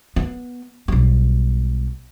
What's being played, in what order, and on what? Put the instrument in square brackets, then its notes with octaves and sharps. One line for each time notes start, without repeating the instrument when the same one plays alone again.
[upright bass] B3
B1 G3